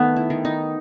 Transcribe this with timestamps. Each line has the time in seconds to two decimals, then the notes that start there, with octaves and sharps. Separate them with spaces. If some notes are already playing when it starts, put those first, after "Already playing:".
Already playing: D#3 A3 B3
0.16 E4
0.30 D#3
0.45 D#4